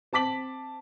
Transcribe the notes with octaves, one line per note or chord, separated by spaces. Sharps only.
C4 A5 D6 B6 F#7